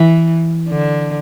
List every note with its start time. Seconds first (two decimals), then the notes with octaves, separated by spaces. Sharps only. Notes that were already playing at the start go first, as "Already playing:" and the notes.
Already playing: E3
0.68 D3